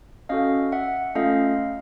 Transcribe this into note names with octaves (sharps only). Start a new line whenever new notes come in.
C#4 F#4 A4 D#5 F5
E5 F#5
A3 C#4 F4 A4 D#5 F5